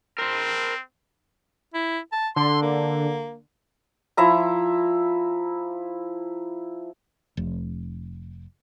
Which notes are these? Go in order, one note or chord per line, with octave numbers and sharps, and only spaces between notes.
C4 A#4 C5
E4
A5
D3 C6
A#3
F3 E4 E5 A#5
F1